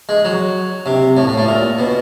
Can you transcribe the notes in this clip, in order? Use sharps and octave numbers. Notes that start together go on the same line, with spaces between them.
G#3
F#3
C3
A2
A2
A2
A#2
B2